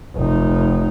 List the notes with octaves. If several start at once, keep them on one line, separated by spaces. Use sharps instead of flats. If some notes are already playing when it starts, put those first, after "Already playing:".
F1 D#4